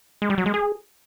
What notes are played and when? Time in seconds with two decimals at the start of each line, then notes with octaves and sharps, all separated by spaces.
0.22 G#3
0.30 G3
0.38 F#3
0.46 G#3
0.54 G#4